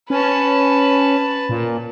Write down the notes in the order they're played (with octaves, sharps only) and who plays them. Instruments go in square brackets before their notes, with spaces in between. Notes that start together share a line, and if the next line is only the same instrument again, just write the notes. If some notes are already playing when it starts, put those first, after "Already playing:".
[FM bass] C#4 [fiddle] B4 A5
[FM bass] A#2